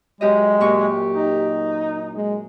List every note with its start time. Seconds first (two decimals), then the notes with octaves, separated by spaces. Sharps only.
0.21 F#2 G#3 G4 D#5
0.61 A#2 G4 C#6
1.14 D#4
2.15 G#3